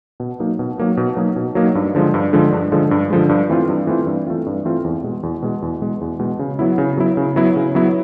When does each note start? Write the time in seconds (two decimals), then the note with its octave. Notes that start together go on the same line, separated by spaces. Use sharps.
0.20 B2
0.40 F#3 A#3 D#4
0.59 B2
0.78 F#3 A#3 D#4
0.97 B2
1.17 F#3 A#3 D#4
1.36 B2
1.55 F#3 A#3 D#4
1.75 G2
1.95 D3 F3 G#3
2.14 G2
2.33 D3 F3 G#3
2.52 G2
2.72 D3 F3 G#3
2.91 G2
3.10 D3 F3 G#3
3.29 G2
3.50 E3 A3 C4 F4
3.69 G2
3.87 E3 A3 C4 F4
4.07 G2
4.27 E3 A3 C4 F4
4.46 G2
4.65 E3 A3 C4 F4
4.84 E2
5.03 B2 G#3
5.23 E2
5.42 B2 G#3
5.62 E2
5.82 B2 G#3
6.01 E2
6.19 B2 G#3
6.39 C#3
6.59 F#3 B3 E4
6.78 C#3
6.97 F#3 B3 E4
7.17 C#3
7.36 F#3 B3 E4
7.56 C#3
7.75 F#3 B3 E4